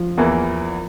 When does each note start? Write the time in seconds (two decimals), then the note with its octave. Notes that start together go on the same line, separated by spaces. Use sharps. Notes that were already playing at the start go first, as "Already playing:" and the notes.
Already playing: F3
0.18 E2 E3 A#3 E4